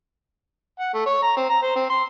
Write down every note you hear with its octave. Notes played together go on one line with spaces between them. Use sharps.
F#5
A3
C#5
A#5
C4
A#5
C5
C4
C6